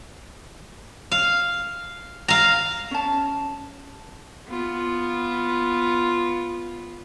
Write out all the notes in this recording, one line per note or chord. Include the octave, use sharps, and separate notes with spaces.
F5
F5 A#5
C#4 A5
B3 F4